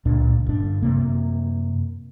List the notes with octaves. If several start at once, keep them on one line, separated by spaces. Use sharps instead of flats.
C#2 A#2 D4
G1 D4
F#2 C3 A#3